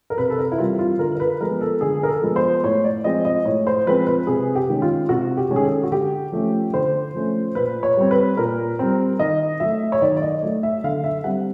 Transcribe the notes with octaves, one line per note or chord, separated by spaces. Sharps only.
A#4
C3 B4
A4
A#4
E4
E3 G3 C4 F4
F4
D3 A#4
A#4
B4
F3 G#3 B3 A#4
A4
D3 G#4
A#4
A4
F3 G#3 B3
C5
A2 C#5
D5
F3 G#3 C4 D#5
D#5
A2 C#5
C5
F3 G#3 C4 B4
B4
C3 G#4
G4
D#3 G#3 C#4
F4
C3 F#4
G4
D#3 G#3 C#4
G#4
A4
F#4
D3 G4
F3 A3 C#4
D3 C5
F3 A3 C#4
A#2 B4
C#5
G3 C4
B4
A#2 A#4
G3 C4
D#3 D#5
F#3 A3 E5
C#5
D#3 D5
D5
D#5
F#3 A3
E5
D3 F5
E5
G3 C4 F#5